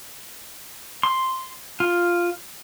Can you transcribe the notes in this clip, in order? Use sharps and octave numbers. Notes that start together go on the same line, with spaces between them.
C6
F4